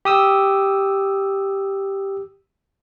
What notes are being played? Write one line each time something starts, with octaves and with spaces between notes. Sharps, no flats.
G4 D#6 E6